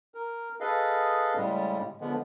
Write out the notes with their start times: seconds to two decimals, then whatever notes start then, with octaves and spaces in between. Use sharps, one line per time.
0.14 A#4
0.60 G#4 A4 B4 D#5 F5
1.36 A2 C#3 G3 G#3
2.01 D3 F3 G#3 B3